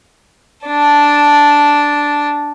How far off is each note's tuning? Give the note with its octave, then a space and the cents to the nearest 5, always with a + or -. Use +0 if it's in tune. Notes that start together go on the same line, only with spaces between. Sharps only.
D4 -5 A5 -5